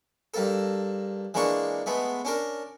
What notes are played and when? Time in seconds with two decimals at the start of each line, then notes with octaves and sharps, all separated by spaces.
0.34 G2 A#3 A4
1.34 E3 G#3 A#3 D4 C#6
1.86 G#3 A3 B3
2.25 C#4 D4 A#4